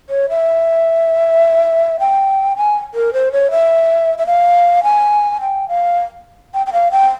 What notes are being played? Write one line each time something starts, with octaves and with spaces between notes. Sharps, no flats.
C#5
E5
G5
G#5
A#4
C5
C#5
E5
E5
F5
G#5
G5
F5
G5
G5
F5
G5